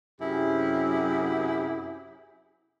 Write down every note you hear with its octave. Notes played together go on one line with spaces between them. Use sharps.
F#2 C3 F#3 E4 G4 G#4